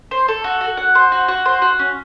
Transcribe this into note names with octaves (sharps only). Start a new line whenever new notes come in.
C5
A4
F#4
F#4
F#5
C5
F#4
F#4
C5
F#4
C#4